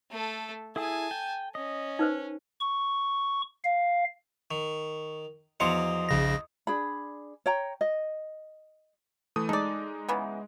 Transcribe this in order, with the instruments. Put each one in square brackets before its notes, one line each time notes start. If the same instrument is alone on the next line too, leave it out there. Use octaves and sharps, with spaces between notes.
[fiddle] A3 A4
[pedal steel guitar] E4 G#4 [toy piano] A4 [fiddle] G#5 A5
[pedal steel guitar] G5
[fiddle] C#4 [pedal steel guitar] D#5
[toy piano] D#4 B4 C5
[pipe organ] C#6
F5
[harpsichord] D#3 [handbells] C#6
[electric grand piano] E2 C6 C#7 [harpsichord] F3 F#3 D6 [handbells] D#5 D#6
[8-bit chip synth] A#1 C#3 A#6
[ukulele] D4 G#4 B5
C#5 G5 A#5
D#5
[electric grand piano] E3 A3 D#6
[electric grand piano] G#3 D#4 [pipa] A4 D5
[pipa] C#3 E3 B3